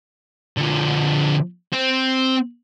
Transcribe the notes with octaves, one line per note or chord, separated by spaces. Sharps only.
D3 F3
C4